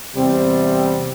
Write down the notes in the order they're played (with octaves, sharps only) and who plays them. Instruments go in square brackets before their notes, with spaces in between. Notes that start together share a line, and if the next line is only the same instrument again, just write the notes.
[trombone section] E2 C3 G3 C4